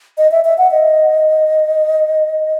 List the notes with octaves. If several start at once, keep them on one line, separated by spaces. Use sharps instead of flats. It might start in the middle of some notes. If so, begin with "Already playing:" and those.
D#5
E5
E5
F#5
D#5